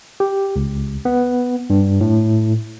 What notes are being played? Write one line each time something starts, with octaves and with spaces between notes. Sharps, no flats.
G4
C#2
B3
G2
A2